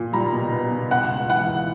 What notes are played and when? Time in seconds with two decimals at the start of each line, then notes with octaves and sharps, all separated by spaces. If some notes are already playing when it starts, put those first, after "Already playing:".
Already playing: A#2
0.13 G3 A#5
0.32 B2
0.51 B3
0.71 B2
0.90 C#3 F#5
1.10 C#2
1.29 E3 F#5
1.48 C#2